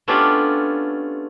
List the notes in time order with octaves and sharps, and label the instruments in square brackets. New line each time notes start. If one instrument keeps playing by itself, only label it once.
[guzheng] A3 B3 C#4 D4 F4 G4